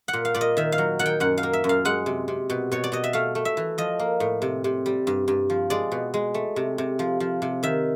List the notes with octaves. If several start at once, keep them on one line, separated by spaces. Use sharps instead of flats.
F#5
A#2
F5
A#2 D5
D#5
D#3 E5
F5
F#3
D#3 F#5
G5
F#2 F#5
F5
A#3
E5
F#2
F5
G#3 F#5
C3
C3
B2
B2 C#5
D5
B2 D#5
E5
A3 F5
A3
E5
E3
F3 D#5
A#3
A2
C3
C3
G3
G2
G2
F3
G#3 D5
B2
G#3
A3
C3
C3
F3
F3
C3
D#3 E5